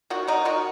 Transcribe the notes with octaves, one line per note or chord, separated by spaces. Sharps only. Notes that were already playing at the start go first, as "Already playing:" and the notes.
D#3 F#4
D#3 D#4
D#3 F#4